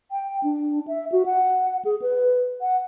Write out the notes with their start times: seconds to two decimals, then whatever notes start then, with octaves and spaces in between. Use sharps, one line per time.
0.11 G5
0.43 D4
0.87 E5
1.12 F#4
1.26 F#5
1.85 G#4
2.02 B4
2.61 F#5